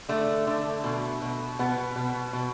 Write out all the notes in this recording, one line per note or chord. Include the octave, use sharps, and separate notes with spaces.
D3 A3
D3
B2
B2
B2 B3
B2
B2